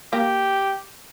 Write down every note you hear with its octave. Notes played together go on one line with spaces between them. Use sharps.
A#3 G4